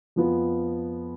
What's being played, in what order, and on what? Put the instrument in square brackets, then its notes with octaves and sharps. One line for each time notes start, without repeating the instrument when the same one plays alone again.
[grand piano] F2 F3 B3 F4